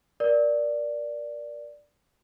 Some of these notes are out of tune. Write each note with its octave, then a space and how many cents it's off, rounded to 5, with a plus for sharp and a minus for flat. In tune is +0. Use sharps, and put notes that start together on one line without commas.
A#4 +25 D5 +0